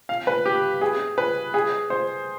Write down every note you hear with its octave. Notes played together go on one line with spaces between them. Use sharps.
F5
B4
G4
G#4
B4
G#4
C5